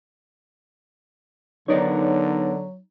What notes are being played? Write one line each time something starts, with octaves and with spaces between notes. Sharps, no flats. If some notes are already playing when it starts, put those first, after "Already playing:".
D3 F#3 B3 D#4 A#4 C#5 D5